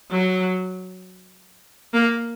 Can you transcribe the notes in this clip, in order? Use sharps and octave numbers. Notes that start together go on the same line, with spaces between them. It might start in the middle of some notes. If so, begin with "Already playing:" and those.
F#3
A#3